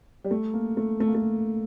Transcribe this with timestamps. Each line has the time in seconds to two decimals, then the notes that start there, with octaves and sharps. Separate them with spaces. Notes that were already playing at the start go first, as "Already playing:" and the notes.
0.24 G3
0.31 A3
0.54 A#3
0.77 A3
1.00 A3
1.08 A#3
1.15 A3